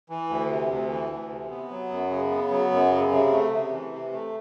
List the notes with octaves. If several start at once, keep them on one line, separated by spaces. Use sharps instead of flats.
E3
D2
C3
D2
E3
D2
C3
B3
F#3
F#2
C#3
B3
F#3
F#2
C#3
C3
A3
C3
E3
C3
A3